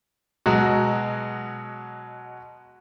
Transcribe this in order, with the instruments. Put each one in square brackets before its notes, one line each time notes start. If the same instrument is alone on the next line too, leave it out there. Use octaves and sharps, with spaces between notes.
[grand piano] B2 F#3 G#3 F#4